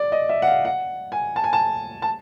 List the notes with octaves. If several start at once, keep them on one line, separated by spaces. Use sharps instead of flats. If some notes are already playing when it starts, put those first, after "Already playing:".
Already playing: D5
D#5
E5
F#5
F5
F#5
G#5
A5
G#5
A5
A5